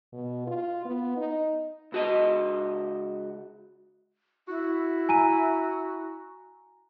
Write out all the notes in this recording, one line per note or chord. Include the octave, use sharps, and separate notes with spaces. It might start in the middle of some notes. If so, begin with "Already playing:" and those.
B2
F4
B3
D#4
C#2 F#4 D#5
E4 F#4
G#5 A#5 D#7